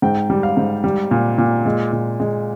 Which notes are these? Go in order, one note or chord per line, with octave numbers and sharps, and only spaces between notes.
G#2 G5
G3
F5
G#2
G3
A#2
A#2
G#3
A#2
G#3